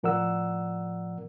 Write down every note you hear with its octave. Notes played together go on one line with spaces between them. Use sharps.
A2 F3 A#4 D5 F#5 E6